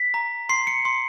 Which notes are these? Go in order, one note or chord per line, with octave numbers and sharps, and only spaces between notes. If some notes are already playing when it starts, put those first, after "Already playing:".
Already playing: B6
A#5
C6 C7
C#7
C6